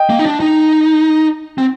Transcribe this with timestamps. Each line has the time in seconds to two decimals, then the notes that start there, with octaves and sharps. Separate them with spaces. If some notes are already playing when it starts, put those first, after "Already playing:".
Already playing: D#5 G5
0.10 A#3
0.19 D#4
0.26 D4
0.40 D#4
1.58 C4